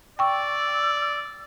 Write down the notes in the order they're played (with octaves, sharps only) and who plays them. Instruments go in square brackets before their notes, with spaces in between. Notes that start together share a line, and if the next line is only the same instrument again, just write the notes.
[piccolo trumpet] D5 [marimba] G5 C#6 [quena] E6